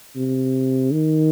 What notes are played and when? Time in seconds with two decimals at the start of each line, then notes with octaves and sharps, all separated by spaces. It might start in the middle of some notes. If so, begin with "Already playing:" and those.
0.16 C3
0.92 D#3